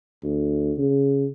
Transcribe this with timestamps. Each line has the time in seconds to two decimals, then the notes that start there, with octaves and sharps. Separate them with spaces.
0.23 D2
0.78 C#3